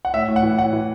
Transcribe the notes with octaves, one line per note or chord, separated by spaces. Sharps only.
F#5
A2 E5
A2
F#5
E3
A2 F#5
E3